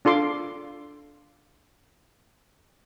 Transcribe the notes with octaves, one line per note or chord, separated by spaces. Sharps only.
D4 F4 A4 C6 D6